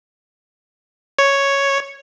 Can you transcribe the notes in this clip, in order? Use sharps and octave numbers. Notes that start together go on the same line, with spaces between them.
C#5